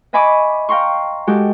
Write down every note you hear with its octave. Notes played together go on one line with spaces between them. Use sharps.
D#5 E5 G#5 B5 C#6 D6
F5 G5 A#5 C6 C#6
G#3 F#4 G4 A4